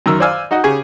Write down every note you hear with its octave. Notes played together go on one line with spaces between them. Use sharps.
F#2 D#3 A#4 E6
C5 D5 F5 G#5 E6 F6
D#4 F#4 D#5 F#5
C#3 G4 G#4 G#5 C#6